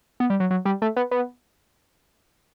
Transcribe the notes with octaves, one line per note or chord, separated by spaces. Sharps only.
B3
G3
F#3
F#3
G3
A3
B3
B3